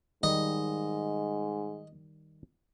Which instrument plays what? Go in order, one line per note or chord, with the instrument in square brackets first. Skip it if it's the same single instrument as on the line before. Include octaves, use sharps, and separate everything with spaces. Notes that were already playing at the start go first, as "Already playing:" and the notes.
[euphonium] G#2 [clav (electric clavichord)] D#3 G3 [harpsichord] D#5